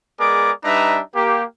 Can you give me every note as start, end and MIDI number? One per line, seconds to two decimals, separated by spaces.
0.20 0.51 56
0.20 0.51 59
0.20 0.51 68
0.20 0.51 70
0.20 0.51 74
0.20 0.51 86
0.64 1.00 55
0.64 1.00 62
0.64 1.00 63
0.64 1.00 71
0.64 1.00 76
0.64 1.00 82
1.15 1.44 58
1.15 1.44 67